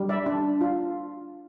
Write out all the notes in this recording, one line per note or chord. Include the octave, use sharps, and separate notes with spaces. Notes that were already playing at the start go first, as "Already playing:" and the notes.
Already playing: G3
D5 E5
D4
F4